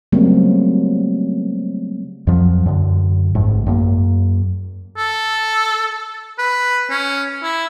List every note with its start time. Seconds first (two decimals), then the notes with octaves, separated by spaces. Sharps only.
0.12 C#3 F#3 G3 A3 A#3 C4
2.27 F2 F3 F#3
2.66 F#2 D3
3.35 A1 G#2
3.67 F#2 A#3
4.97 A4
6.39 B4
6.90 C#4
7.43 E4